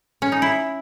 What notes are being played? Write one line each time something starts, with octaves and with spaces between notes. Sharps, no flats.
C#4
D#4
E4